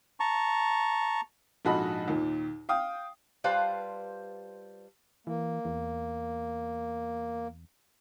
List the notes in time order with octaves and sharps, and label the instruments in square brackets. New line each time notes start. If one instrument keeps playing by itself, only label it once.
[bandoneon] A5 A#5 C#6
[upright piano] A#1 G#2 F#4 A4 D#5 B5
D#2 A#2
F5 G5 D#6
[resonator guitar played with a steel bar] G3 F4 B4 C5 F5 A5
[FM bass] E3 [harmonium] A#3
[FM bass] E2